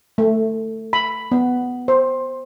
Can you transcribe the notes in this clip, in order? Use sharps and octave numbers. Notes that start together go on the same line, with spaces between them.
A3
B5
B3
C5